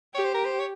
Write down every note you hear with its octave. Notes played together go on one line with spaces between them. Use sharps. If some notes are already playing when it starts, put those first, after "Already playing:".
G4 C#5
C5
A#4
C5
C#5